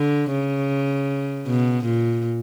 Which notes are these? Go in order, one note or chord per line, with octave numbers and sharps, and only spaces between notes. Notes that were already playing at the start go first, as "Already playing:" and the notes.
Already playing: D3
C#3
B2
A#2